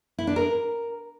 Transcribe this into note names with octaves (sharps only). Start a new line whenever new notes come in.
E4
D4
A#4